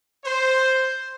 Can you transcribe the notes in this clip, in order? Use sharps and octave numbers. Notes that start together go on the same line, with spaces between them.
C5